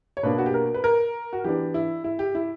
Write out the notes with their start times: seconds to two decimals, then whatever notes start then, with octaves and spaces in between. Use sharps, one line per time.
0.17 C#5
0.23 B2 A#3 D4 B4
0.38 F#4
0.46 G4
0.54 A#4
0.74 B4
0.84 A#4
1.33 F#4
1.44 E3 B3 D4 G4
1.74 E4
2.04 E4
2.19 G4
2.35 E4